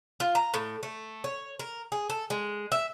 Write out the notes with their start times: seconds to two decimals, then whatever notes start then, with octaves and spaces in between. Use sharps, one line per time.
0.20 F4
0.35 A#5
0.54 A2
0.83 A3
1.24 C#5
1.59 A#4
1.92 G#4
2.10 A4
2.30 G#3
2.72 E5